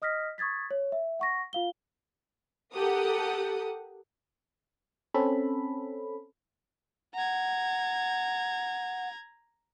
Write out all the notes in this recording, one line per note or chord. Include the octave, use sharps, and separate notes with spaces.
D#5 D#6 F6 A#6 B6
C#6 D#6 G#6 A6 B6
C#5
E5
F#5 C#6 A#6
F4 F5 G7
G4 A4 A#4 F#5 D#6
C4 C#4 A4 B5
F#5 A#5 G#6